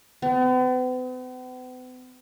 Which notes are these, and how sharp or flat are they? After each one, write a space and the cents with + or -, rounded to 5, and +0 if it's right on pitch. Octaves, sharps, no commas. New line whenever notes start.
B3 +45